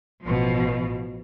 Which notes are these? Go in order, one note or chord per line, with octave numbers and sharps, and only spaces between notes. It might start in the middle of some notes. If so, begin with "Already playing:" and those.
A1 B2 F3